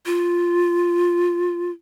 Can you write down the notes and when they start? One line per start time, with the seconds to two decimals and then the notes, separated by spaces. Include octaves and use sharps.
0.06 F4